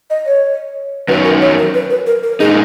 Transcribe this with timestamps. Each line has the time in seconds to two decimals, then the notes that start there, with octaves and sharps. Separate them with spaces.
0.10 D#5
0.26 C#5
1.08 F#2 D#3 F#3 C#4 B4
1.24 A#4
1.41 C#5
1.58 A#4
1.74 B4
1.90 B4
2.07 A#4
2.23 A#4
2.40 A#2 G#3 D#4 G#4